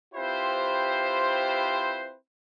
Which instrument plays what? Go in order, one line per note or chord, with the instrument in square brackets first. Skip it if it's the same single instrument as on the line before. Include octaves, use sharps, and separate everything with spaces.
[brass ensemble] C4 E4 F4 G4 B4 C5